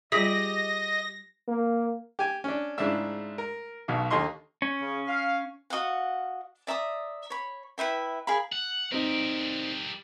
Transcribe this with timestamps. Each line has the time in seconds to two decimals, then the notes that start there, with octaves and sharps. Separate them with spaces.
0.12 G3 F4 G4 G#4 D#5 E5 A#6
1.48 A#3
2.19 G4 G#5
2.44 C#4 D4
2.78 G#2 C#3 D4 E4 E5 E6
3.38 A#4
3.88 B1 B2 F5
4.11 D#2 D3 D#5 C6 C#6
4.62 C#4
4.82 C#3
5.08 F5
5.70 F#4 D#5 F5 F#5
6.67 D5 E5 A#5 D#6
7.30 C#5 B5
7.78 E4 B4 E5 G5
8.27 G#4 A#4 F5 B5
8.52 F#5
8.92 G3 C4 D#4 A#4